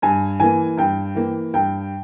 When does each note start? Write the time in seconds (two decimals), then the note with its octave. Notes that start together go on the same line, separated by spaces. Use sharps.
0.02 G2 G#5
0.40 E3 A#3 G#5
0.77 G2 G5
1.15 E3 A#3
1.54 G2 G5